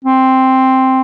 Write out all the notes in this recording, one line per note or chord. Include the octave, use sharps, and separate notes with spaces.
C4